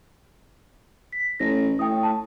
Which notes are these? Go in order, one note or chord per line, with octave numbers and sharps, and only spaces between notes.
B6
A1 A#6
A2 G5 D#6
A5